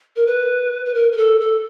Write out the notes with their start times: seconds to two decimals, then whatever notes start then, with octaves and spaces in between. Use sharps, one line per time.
0.16 A#4
0.27 B4
0.86 B4
0.94 A#4
1.12 A#4
1.17 A4
1.40 A4